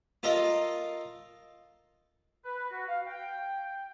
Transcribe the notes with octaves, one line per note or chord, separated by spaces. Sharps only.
F4 A4 A#4 D#5 F5
B4
F#4
F5
G5